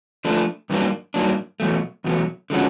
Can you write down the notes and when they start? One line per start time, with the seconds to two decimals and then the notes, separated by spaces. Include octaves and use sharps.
0.25 F3 A3 D4
0.70 G2 D#3 F#3 A#3 D4
1.14 G2 D#3 F#3 A#3 D4
1.60 E2 B2 F#3 A3
2.04 E2 B2 F#3 A3
2.50 D3 F3 G#3 C#4 F#4